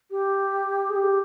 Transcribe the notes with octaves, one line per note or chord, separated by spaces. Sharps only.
G4
G#4
G4